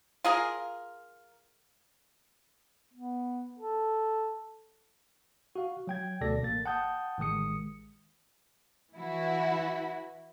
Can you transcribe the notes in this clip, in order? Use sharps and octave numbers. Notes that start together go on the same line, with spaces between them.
F4 G#4 A#4 F5
B3
A4
F#4 F5
F#3 G5 G#6
D2 B2 A4 D5 A#6
A1 A#3 A6
F#5 G5 A5 D#6 G6
A1 D#3 G#3 D#6 C#7
E3 E4 F#4